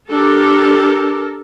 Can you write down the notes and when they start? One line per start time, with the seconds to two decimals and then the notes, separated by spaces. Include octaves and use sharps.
0.11 D4 G4 A4 A#4